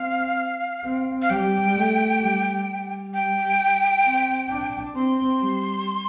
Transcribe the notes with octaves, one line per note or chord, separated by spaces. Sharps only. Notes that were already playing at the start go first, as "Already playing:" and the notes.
Already playing: C4 F5
C4
F5
G3 G5
A3
G3
G3
G5
C4
D4
C4 C6
G3